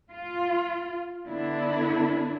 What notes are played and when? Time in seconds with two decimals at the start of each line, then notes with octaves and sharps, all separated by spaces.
0.10 F4
1.28 D3 B3 D4 E4